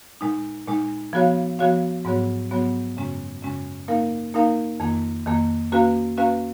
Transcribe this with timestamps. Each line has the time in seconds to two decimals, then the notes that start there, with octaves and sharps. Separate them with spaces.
0.21 A#2 G#3 D#4
0.67 A#2 G#3 D#4
1.13 F3 B3 F#4 C#5 F5
1.59 F3 B3 F#4 C#5 F5
2.05 G#2 F#3 B3 F#4 C#5
2.51 G#2 F#3 B3 F#4 C#5
2.97 F#2 C#3 G#3 C#4
3.42 F#2 C#3 G#3 C#4
3.88 A#3 D#4 A#4 F5
4.34 A#3 D#4 A#4 F5
4.80 F2 D#3 A#3
5.26 F2 D#3 A#3
5.72 A#3 C#4 F#4 B4 F5
6.18 A#3 C#4 F#4 B4 F5